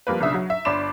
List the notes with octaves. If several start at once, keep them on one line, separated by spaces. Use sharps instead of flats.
F3 G3 A#3 B4
B1 C#3 D4 E5 D#6
F#3
E5
G1 D4 D5 B5 C6 E7